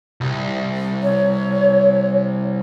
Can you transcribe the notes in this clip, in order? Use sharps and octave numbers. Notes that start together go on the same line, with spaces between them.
C2
C#5